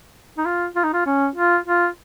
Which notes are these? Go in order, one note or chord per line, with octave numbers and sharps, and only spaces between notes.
D#4
F4
F4
D#4
F4
C#4
F4
F4